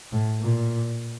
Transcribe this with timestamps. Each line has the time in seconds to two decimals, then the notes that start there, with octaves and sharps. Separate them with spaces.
0.12 A2
0.41 A#2